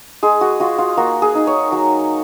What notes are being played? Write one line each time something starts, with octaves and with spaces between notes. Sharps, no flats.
G#3 G#4
F#4
F4 F#4
F4
A#3 F#4
G#4
D#4
C#5
F#3